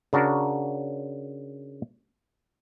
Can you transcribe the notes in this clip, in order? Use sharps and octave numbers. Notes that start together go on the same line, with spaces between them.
C#3 D4 F#4 A#4